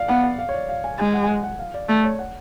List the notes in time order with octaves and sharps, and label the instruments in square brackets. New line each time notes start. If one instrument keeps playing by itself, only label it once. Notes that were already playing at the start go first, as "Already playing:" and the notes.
Already playing: [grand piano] D5 F5
[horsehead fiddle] B3 [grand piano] F#5
[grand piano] F#5
F5
C#5
D5
F5
G#5
[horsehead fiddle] G#3 [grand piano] G#5
[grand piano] F#5
G#5
F#5
F#5
F5
D5
[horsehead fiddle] A3 [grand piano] D5
[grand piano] C#5
F#5